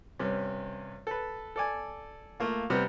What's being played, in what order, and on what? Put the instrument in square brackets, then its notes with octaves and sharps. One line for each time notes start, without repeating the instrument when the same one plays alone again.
[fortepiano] G2 C3 C#4
A4 B4
A4 D5 G#5
A3 A#3 F4
C3 G3 B3